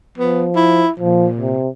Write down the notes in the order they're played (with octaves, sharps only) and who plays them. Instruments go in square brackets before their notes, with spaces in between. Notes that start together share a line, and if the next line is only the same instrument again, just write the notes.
[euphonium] F3 [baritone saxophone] B3
[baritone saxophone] E4
[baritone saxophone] A#2 [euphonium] F3
[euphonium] C3